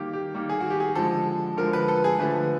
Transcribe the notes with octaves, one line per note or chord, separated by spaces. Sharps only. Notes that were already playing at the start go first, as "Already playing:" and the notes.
Already playing: D#3 G3 A#3 G4
G4
D#3 G3 A#3
G#4
F#4
G4
G#4
D3 F3 G#3 A4
D3 F3 G#3 A#4
B4
A4
G#4
D3 F3 A3 B4